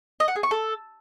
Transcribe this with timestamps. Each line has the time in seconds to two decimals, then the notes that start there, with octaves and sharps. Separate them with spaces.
0.20 D#5
0.28 F#5
0.36 G#4
0.43 C#6
0.51 A4